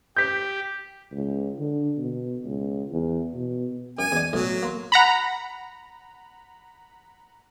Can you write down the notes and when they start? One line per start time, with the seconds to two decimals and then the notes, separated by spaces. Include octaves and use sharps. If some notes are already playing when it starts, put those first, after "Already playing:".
0.16 G4 G6 B6
1.12 C#2
1.59 D3
1.97 B2
2.44 C#2
2.92 E2
3.34 B2
3.99 F#2 G#5
4.12 E2 D5
4.33 B1 A2 F#3 D#6
4.50 C#6
4.62 A#3 A#5 C6
4.92 F#5 A#5 B5